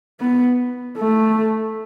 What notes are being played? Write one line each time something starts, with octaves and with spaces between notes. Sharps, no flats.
B3
A3